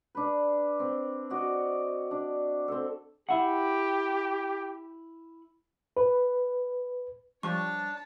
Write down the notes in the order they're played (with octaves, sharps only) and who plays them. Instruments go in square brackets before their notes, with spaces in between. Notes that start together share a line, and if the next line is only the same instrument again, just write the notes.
[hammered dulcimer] D4 B4
C4
F#4 D5 D#5
D4
C4 A4
[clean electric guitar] E4 F#5 [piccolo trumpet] G4
[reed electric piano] B4
[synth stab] F3 G3 [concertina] D4 [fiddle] C#5 A5 [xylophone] C#6